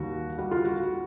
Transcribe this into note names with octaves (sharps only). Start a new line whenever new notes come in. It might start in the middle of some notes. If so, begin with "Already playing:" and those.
Already playing: D#2 G3 F#4
G3 F#4
F4
F#4
G3